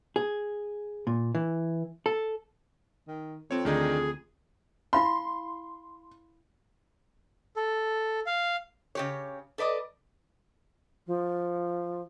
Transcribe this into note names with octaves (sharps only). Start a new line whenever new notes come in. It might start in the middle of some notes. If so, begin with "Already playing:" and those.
G#4
A#2
E3
A4
D#3
F2 C4 C#5
D2 D#3 D4 D#4 G#4
E4 F5 B5 C6
A4
F5
C#3 G4 C#5
A4 B4 D5 D#5
F3